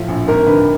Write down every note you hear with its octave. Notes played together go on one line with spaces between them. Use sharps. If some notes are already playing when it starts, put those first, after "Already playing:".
Already playing: A2 F3
A#1
G#1 A#4
D3 B4